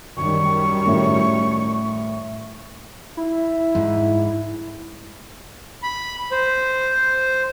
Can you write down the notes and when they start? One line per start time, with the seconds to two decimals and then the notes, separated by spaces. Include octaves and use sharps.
0.17 F#2 D#3 G3 C#6
0.87 A2
3.17 E4 E5
3.75 G#2
5.83 B5
6.32 C5